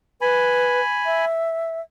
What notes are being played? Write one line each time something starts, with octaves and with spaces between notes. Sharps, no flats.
B4 G#5 B5
E5